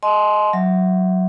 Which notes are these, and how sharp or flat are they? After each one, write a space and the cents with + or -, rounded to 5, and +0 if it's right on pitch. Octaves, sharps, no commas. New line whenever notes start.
D#5 +0 G#5 +45 C6 +0
F#3 +0 E5 +0